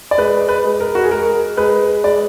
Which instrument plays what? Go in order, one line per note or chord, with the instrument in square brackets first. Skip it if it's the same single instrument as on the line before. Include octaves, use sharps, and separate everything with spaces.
[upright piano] D5
G#3 B4
B4
G#3
A#4
F#4
G#4
G#3 A#4
G#3 B4
G#3 D5